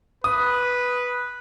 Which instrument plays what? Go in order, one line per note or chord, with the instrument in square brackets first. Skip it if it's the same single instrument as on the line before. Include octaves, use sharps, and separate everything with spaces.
[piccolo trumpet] B4 [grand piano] D#6